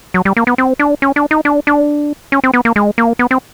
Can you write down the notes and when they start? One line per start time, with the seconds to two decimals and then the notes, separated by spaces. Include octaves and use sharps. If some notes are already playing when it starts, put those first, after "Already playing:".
0.14 F#3
0.25 G3
0.37 A#3
0.47 B3
0.58 C4
0.79 D4
1.02 C#4
1.16 D4
1.31 D#4
1.45 D4
1.67 D4
2.32 C#4
2.44 C4
2.54 B3
2.65 A#3
2.76 G#3
2.98 A#3
3.19 B3
3.31 C4